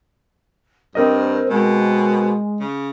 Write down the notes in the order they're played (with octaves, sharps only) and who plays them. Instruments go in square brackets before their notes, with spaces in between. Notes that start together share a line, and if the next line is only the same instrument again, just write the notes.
[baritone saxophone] G2 [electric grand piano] C4 A#4 D#5 [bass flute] C5
[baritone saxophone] B2 [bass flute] G#3
[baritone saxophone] C#3